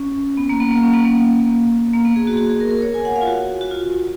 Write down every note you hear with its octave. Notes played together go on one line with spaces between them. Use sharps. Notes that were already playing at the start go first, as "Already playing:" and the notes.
Already playing: C#4
B3
A#3
B3
A#3
C#4
B3
A#3
A#3
B3
G#4
F#4
G#4
F#4
G#4
A#4
A#4
C#5
G#5
F#5
F5
F4
F#4
F#4
F4